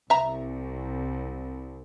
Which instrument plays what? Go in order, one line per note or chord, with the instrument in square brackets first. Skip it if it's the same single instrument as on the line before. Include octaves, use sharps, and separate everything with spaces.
[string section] C2 [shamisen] E5 A#5